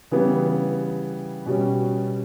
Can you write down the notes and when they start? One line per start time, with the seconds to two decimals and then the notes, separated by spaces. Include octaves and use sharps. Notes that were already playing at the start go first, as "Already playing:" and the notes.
0.11 C#3 E3 G3 B3
1.46 B2 G3 C#4